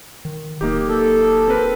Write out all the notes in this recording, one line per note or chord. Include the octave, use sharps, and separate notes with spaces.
D#3
D1 A#3 D#4 G4
A4
C4 A#4 B4